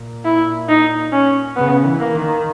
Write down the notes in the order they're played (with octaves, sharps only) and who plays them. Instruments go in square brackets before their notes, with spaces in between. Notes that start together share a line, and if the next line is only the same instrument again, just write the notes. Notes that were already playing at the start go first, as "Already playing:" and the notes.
Already playing: [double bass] A#2
[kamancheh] E4
D#4
C#4
[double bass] C#3 [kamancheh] B3
[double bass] E3
[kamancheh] A#3
[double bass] D#3